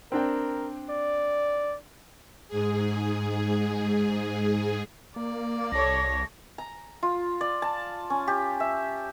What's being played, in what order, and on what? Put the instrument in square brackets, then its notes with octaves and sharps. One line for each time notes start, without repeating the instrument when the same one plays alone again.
[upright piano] C4 D4 G5 [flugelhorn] A#4
[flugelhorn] D5
[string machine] G#2 G#4
[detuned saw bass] A#3 [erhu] D5
[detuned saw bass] C2 [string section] A4 C#5 [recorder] A#6
[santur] A#5
F4
D5
A5
C#4
G4
E5